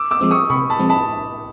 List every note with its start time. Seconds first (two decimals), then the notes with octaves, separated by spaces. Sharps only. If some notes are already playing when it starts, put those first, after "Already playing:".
Already playing: D6 E6
0.11 D6 E6
0.21 F3 G#3 C4
0.31 C#6 D#6
0.50 C3 B5 C#6
0.70 A5 B5
0.79 F3 G#3 C4
0.89 A5 B5